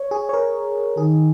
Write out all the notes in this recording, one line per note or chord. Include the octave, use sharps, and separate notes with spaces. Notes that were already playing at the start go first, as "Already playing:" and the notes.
Already playing: C#5
G#4
C#5
A#4
D#3 G#4